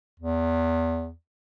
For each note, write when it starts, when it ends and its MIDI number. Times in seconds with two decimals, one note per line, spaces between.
0.19 1.12 40